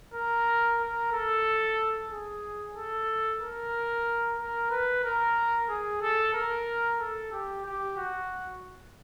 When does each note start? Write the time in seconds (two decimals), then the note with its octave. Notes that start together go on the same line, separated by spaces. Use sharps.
0.14 A#4
0.80 A#4
1.13 A4
2.11 G#4
2.75 A4
3.41 A#4
4.38 A#4
4.71 B4
5.04 A#4
5.69 G#4
6.01 A4
6.34 A#4
7.00 A4
7.32 G4
7.65 G4
7.97 F#4